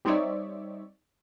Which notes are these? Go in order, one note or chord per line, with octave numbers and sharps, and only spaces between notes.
G3 C4 D#4 C#5 D5 E5